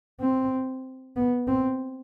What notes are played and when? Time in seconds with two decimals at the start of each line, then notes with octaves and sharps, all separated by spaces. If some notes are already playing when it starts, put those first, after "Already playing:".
0.21 C4
1.16 B3
1.47 C4